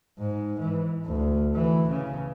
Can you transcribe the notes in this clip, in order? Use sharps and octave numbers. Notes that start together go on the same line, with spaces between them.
G#2
E3
D2
E3
C#3